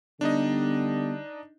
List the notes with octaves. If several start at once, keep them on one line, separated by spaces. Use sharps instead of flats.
D3 G3 B3 D4 D#4 D#5